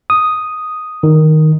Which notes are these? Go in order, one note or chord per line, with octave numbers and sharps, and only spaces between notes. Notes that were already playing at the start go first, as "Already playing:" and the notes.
D#6
D#3